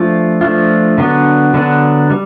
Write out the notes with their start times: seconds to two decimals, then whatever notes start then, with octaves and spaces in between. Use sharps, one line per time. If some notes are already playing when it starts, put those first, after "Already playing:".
Already playing: F3 A3 D4 F4
0.41 F3 A3 D4 F4
0.98 D3 F#3 B3 D4
1.54 D3 F#3 B3 D4
2.10 G3